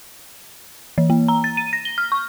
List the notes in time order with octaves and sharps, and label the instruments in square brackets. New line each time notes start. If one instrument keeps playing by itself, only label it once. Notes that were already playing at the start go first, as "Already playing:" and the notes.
[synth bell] E3
A#3
A#5
A6
D#7
A#6
G7
F6
C#6